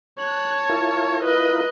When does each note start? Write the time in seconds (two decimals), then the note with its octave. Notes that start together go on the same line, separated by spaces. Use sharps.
0.18 C#5 A5 F#6
0.69 E4 F4 A#4
1.23 B4 D#5